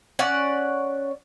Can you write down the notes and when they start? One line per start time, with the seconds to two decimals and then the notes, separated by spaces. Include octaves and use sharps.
0.19 C#4 D5 F#5